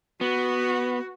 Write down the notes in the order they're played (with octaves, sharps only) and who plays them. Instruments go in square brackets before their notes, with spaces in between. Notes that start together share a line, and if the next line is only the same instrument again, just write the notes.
[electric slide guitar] B3 [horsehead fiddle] F#4